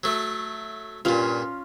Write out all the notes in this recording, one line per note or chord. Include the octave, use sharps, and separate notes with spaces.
F#3 A3
G2 A#2 C#4 F4